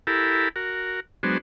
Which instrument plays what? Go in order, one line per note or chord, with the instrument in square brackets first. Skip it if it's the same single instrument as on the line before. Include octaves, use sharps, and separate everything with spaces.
[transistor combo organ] E4 G4 A4 A#4 B5
F#4 A#4
F#3 G#3 B3 D4 C5